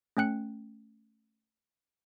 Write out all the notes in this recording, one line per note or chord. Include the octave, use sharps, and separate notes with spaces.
A3 C#4 G5 F#6 C#7